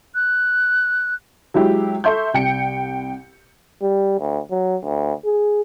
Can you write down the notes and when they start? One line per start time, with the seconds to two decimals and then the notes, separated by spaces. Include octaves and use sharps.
0.15 F#6
1.54 F#3 G#3 E4 G4
2.04 A4 E5 C6 C#6 G6
2.34 C2 G5 C#7
3.82 G3
4.20 D2
4.51 F#3
4.83 D2
5.25 G#4